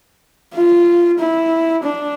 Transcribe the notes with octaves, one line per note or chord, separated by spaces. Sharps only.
F4
E4
D4